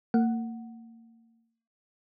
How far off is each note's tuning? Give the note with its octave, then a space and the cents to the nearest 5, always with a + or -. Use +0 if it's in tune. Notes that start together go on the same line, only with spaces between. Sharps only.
A#3 -35 F#5 +0